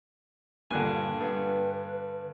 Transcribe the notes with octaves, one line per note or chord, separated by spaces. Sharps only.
G2 A#2 D3 G#5 F#6
G2 B4